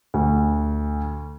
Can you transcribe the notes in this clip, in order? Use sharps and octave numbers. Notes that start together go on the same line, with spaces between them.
D2